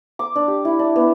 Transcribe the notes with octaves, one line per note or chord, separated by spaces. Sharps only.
D6
D4
G4
E4
D4
B3